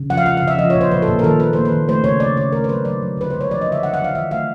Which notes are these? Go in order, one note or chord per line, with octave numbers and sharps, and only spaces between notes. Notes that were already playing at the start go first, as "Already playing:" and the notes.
Already playing: C#3
F3 F#5
F5
G#3 F#5
F5
C#3 E5
F3 D#5
C#5
A#2
C5
F3 B4
A4
A#2
A#4
D#3 A4
D#3 B4
A#3 C5
B4
D#3
A3 C5
C#3 C#5
C#3 D5
C#3 C#5
A3 A#4
C5
F#3 B4
F#3 D5
F#3
D3 B4
G#3 C5
C#5
F3 D5
D#5
D3
E5
D#3 F#5
F#5
F#3
F5
D#3 E5
A3 F5